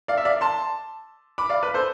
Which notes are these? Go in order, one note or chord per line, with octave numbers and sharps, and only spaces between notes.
D5 F5
E5
D5 F5
A5 C6
B5 D6
D5 F5
B4
A4 C5